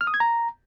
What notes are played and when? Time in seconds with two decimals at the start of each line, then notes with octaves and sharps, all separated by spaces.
0.01 F6
0.07 D#6
0.14 G#6
0.20 A#5